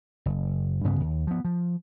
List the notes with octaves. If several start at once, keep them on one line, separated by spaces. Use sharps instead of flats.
F#1
D2 G2 C#3 B3
D#2
F3 B3
F3